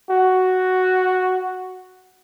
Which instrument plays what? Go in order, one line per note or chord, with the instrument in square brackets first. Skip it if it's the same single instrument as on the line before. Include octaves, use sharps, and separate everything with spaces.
[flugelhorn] F#4